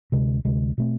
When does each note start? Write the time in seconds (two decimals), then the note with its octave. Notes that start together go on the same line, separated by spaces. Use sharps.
0.12 D2 C3 G#3
0.45 D2 C3 G#3
0.78 B2 A3 C4